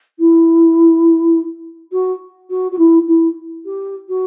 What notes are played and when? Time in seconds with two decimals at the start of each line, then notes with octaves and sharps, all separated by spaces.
0.19 E4
1.92 F#4
2.50 F#4
2.72 F#4
2.78 E4
3.07 E4
3.65 G4
4.09 F#4